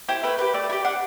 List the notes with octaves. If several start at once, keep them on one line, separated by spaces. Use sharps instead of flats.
E4 G4 C5
A3 B4
E4 G4 B4
A3 D5
E4
G4
D4 F#5